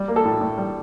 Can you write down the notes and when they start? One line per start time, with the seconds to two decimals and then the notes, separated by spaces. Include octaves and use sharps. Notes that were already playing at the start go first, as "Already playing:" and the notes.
Already playing: G3
0.08 A#3
0.16 A4
0.25 A2
0.41 A2
0.58 G3